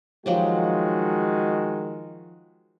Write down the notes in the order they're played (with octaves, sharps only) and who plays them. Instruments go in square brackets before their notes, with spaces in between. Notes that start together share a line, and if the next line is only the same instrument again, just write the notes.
[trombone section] D#3 G#3 F#4 [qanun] F3 F#3 G4